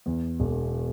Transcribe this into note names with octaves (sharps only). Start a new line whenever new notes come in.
E2
E1